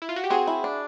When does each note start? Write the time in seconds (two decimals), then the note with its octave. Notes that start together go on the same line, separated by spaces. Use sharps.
0.02 E4
0.09 F4
0.16 F#4
0.24 G4
0.30 C4 F#4 G#4
0.47 E4
0.64 D4